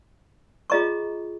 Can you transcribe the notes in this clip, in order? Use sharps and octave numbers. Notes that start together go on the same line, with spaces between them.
F4 G#4 D#5 A#5 C#6